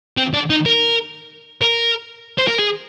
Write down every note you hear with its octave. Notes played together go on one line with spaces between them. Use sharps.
C4
D4
D#4
A#4
A#4
C5
A#4
G#4